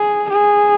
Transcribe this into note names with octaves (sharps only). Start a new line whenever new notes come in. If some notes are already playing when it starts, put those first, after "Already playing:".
Already playing: G#4
G#4